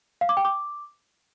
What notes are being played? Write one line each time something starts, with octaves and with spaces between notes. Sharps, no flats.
F5
D6
G5
D6